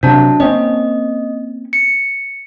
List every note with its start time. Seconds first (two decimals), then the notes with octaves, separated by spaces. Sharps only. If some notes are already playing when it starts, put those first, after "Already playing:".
0.03 C3 F#3 D4 A5
0.40 A#3 C4 C#4 D#5
1.73 C#7